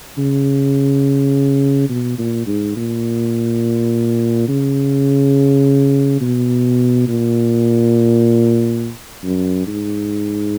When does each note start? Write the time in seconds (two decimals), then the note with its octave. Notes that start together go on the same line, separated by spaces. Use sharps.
0.18 C#3
1.89 B2
2.19 A#2
2.47 G#2
2.76 A#2
4.48 C#3
6.21 B2
7.08 A#2
9.24 F#2
9.67 G#2